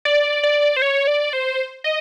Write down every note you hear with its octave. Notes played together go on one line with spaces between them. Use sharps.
D5
D5
C5
C#5
D5
C5
D#5